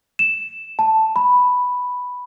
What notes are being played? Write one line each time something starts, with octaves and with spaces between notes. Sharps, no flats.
E7
A5
B5